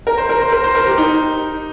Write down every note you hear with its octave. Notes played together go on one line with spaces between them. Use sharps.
A#4
C5
A#4
C5
A#4
C5
A#4
G4
D#4